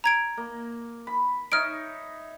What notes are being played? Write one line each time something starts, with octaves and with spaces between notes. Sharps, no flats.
A#5 G#6 D7
A#3
B5
D#4 C#5 E5 F6 D7